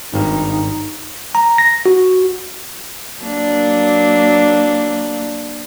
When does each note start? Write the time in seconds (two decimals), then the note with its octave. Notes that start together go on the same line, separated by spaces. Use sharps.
0.14 G#1 G2 D#4
1.35 A#5
1.58 A#6
1.86 F#4
3.22 F#3 A#3 D4